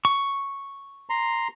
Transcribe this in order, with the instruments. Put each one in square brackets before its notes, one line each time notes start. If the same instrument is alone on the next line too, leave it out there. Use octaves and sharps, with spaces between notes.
[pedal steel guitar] C#6
[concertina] A#5 C6